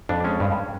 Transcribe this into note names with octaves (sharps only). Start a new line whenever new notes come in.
F2 D4
G#3 C#4
G2